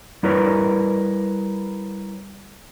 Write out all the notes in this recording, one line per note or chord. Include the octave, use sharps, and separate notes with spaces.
G3 E4 A#4 B4 C#5